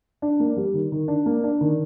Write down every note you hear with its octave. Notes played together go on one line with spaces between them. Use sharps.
D4
A#3
G3
D#3
D#3
D4
A#3
D4
D#3